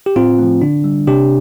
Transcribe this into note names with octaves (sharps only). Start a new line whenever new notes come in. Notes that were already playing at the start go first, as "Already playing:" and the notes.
G4
A2 C4 F4
F3 A3
D3 D4
G3
C3 D4 G4